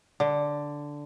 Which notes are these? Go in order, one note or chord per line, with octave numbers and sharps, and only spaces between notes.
D3